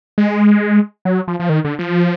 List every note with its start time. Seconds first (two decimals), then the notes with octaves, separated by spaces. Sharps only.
0.18 G#3
1.05 F#3
1.28 F3
1.40 F3
1.49 D#3
1.65 D3
1.79 F3